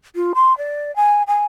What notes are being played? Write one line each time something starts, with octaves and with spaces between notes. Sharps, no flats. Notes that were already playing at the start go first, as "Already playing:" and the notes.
F4
C6
D5
G#5
G#5